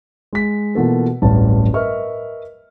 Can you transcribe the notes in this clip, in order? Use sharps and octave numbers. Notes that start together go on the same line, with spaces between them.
G#3 B6
B2 E3 A#3 F4 A4
D1 A1 G2 A5
A#4 B4 D#5 E5 C#6 F6